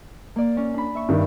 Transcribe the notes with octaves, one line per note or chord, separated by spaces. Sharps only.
A#3 D5
C#4
D4 B5
E5 C#6
G2 D#3